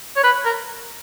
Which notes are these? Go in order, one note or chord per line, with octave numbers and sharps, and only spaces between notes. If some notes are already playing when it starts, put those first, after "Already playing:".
C#5
B4
A#4